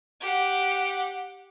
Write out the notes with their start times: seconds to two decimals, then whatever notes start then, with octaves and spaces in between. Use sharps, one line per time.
0.21 G4 F#5